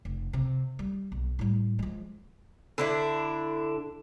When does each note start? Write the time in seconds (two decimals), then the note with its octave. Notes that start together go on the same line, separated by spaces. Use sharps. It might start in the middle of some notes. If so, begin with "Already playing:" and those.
0.05 F1
0.33 C3
0.79 G3
1.12 B1
1.39 A2 G3
1.79 F3 G#3
2.78 D3 D4 E4